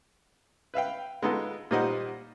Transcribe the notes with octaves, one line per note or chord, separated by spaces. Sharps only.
B4 E5 F5 G5
G#3 B3 D#4 F4 A4
A#2 G3 D#4 C5 D#5 F#5